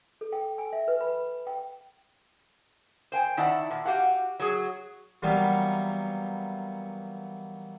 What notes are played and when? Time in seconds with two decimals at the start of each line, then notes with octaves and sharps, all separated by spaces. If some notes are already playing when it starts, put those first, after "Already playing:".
0.21 A4
0.33 G5
0.58 G#5
0.73 E5
0.88 B4
1.01 B5
1.47 G5
3.12 C5 G5 G#5
3.37 D#3 E4 D5 F#5 A5
3.71 A#2
3.85 F#4 G4 F5 F#5
4.40 F#3 G#4
5.22 E3 F#3 G3 A#3 B3